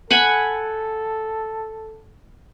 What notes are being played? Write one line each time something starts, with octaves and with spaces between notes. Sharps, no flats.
A4 F#5 G#5 B5